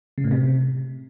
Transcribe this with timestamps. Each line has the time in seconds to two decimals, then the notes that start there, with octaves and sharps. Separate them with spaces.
0.18 C#3
0.24 A2
0.31 C3